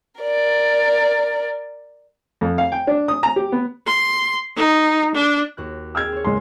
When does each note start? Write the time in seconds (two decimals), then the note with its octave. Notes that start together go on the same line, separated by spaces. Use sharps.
0.21 A#4 D5
2.41 F2
2.58 F5
2.72 G5
2.87 D4
3.08 D#6
3.23 A#5
3.36 G4
3.52 B3
3.87 C6
4.57 D#4
5.15 D4
5.57 D#2 F#4 F#6
5.95 G#4 G5 E6 F6 G#6
6.12 C4 C#5
6.25 F#1 G#3 C6